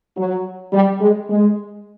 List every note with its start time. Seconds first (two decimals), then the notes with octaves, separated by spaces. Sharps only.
0.17 F#3
0.73 G3
1.01 G#3
1.30 G#3